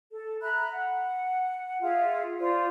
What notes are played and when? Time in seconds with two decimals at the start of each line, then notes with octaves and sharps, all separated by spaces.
0.10 A4
0.41 E5 A#5 B5 F#6
0.72 F#5
1.82 F4 G#4 E5 F5
2.39 F4 C5 D5 F5